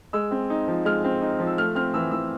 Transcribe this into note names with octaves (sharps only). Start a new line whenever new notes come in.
G#3 E6
C4
D#4
F3
G#3 F6
C4
D#4
F3
E6
A3 F6
C4 F6
E3 E6
E3 E6